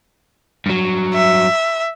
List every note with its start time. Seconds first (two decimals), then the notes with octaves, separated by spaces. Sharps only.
0.66 G2 F#3
1.14 E5